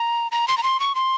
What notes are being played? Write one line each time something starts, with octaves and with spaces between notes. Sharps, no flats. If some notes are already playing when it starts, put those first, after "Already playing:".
Already playing: A#5
A#5
C6
A#5
C6
C#6
C6